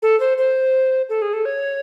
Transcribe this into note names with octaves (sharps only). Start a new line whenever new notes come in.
A4
C5
C5
A4
G#4
A4
C#5